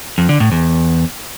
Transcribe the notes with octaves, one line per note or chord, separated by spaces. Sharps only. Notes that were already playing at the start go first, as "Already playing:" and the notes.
F2
D3
A2
E2